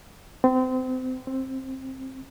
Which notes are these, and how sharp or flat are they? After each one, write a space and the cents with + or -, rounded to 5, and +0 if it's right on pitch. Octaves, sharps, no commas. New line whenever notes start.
C4 -30
C4 +15